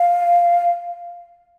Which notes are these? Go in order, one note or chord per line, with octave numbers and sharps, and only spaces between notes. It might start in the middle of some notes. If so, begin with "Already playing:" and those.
Already playing: F5